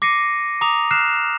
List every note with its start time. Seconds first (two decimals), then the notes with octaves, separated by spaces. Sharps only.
0.02 D6 A#6 C7 C#7 D#7
0.61 A#5 D6 D#6 F7
0.91 F6 F#6 C7 E7